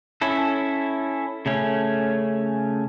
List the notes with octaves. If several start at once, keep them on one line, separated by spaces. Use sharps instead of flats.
C#4 E4 A4
C#3 A3 C#4